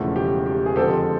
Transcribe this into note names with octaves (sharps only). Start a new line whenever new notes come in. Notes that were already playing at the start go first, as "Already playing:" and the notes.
Already playing: E1 E2 C#3 F3 A3
G4
G4
G#4
F2 D3 F3 G#3 C4 G4 A4